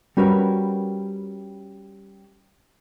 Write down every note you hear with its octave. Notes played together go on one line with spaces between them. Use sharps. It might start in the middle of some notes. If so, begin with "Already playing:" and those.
G3 C#4 F#4 A#4 B4